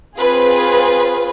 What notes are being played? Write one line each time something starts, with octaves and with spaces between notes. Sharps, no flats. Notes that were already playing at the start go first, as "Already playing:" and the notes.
C4 F4 G#4 B4